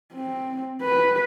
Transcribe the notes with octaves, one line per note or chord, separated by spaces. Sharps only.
C4
B4